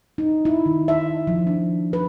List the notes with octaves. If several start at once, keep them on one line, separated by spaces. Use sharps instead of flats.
D#4
E4
D#3
E5
F3
D4
B4